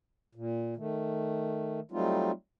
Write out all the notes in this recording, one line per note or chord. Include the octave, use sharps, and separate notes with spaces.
A#2
D#3 A3
F#3 G3 A3 C4 D#4 F4